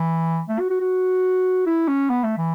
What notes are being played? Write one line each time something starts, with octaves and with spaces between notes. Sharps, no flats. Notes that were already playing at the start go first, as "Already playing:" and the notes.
Already playing: E3
A3
F#4
F#4
F#4
E4
C#4
B3
A3
E3